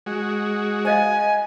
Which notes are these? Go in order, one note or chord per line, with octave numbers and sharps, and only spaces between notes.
G#3 F#4
C5 D#5 F5 G#5